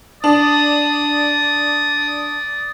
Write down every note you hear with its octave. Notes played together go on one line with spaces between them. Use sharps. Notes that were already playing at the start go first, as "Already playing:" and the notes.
D4 D5 D#6